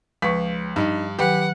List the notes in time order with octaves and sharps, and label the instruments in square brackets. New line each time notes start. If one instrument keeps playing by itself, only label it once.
[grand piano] C#2 B6 [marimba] F3 B4 C#6
[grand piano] G2 [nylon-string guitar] D4 D#4
[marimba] D#3 F#3 [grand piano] G4 [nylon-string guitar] B4 [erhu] F#5